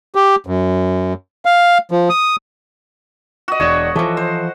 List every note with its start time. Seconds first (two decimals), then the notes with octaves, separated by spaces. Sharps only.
0.15 G4
0.47 F#2
1.45 F5
1.91 F3
2.10 D#6
3.48 F#4 D#5
3.60 E1 D4 C#5 E7
3.96 E3 F3 A4 D6
4.17 C5